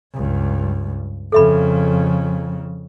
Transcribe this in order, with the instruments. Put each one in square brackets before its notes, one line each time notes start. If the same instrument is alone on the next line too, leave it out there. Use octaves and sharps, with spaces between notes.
[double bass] C#2 G2
[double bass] F2 C#3 [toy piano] A4 E5 B5